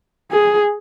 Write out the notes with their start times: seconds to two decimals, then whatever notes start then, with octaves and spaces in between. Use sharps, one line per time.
0.31 G#4